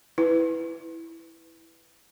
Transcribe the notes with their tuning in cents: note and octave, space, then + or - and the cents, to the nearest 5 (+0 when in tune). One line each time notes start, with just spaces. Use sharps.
E4 +0 B4 +10